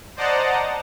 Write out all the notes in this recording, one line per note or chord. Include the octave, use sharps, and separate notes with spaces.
C5 D5 D#5 F#5 A5 A#5